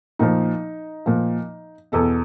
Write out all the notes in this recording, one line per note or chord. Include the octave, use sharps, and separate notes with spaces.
A#2 F3 D#4
A#2 F3
E2 B2 A4